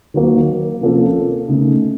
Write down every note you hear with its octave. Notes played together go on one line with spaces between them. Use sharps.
D#3 F#3 A#3
C3 F3 A#3 C#4 A4
C#3 A3 D#4